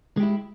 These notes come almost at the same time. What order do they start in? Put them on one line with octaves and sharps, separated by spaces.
G#3 G4 E4